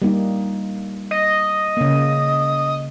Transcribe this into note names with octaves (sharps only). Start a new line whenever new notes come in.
G3 A#3 D#4
D#5
C#3 A#3